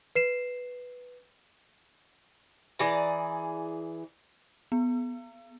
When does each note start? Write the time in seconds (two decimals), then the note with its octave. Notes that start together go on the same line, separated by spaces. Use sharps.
0.15 B4 C7 E7
2.79 E3 G#4 D5 A#5
4.72 B3